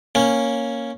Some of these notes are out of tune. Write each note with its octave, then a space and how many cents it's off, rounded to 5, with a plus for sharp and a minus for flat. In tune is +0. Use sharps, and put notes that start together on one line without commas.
A#3 +0 C#4 +0